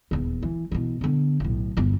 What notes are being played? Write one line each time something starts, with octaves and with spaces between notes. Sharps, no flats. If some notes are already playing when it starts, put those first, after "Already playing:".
D#1 E2
E3
B2 E3
D3 B3
B1 A2
G1 E2